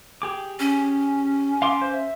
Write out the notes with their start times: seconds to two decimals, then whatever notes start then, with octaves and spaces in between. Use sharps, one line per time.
0.22 G4 G#4 D6
0.60 C#4
1.62 F5 C6 D6
1.82 C5
1.94 E5